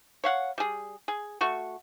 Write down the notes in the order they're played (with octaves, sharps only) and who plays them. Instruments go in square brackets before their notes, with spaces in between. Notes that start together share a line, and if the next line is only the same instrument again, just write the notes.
[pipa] C#5 F5 F#5
G3 G#4
G#4
A3 F#4 C#6